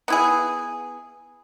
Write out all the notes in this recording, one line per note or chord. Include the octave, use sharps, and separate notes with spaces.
B3 E4 G#4